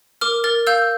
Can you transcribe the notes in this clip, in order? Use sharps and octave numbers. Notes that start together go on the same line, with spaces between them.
A#4 D6 F6
A#4 F6 A6
F5 E6 G6